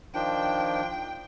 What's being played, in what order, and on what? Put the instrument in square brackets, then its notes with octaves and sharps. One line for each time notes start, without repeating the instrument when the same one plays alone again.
[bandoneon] D#3 F3 D4 [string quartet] G5